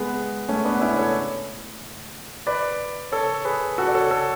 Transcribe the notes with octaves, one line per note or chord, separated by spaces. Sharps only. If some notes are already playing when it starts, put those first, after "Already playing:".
Already playing: G#3 B3
A3 C#4
B3 D4
C#4 E4
A4 C#5
B4 D5
A4 C#5
G#4 B4
F#4 A4
D5
A4 C#5
A4 C#5